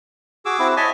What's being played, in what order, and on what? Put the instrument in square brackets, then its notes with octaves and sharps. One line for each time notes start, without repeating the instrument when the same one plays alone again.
[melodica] F#4 [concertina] G#4 D6 E6
[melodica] C4 E4 F#4
[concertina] C#5 E5 [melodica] D#5 G#5 A5